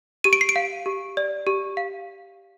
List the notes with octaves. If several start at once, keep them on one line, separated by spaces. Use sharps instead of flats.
G4 D#7
D7
C7
D7
F5
G4
D5
G4
F5